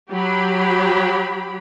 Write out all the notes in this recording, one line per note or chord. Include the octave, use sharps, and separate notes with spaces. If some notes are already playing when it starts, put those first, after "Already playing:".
F#3 G4 B5